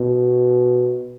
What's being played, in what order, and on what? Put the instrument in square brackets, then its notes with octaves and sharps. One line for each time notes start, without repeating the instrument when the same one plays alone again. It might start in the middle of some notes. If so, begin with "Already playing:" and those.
Already playing: [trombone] B2